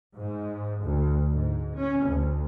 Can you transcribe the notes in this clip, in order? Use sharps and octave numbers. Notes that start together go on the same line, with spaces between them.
G#2
D2
G#2
C#4
D2